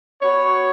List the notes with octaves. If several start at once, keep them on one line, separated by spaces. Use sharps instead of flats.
B3 F#4 C#5